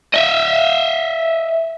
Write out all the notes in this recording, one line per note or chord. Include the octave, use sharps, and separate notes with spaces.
D#5 E5